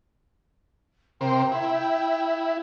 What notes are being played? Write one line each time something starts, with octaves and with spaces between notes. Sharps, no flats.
C3 A#4 C5 G5
E4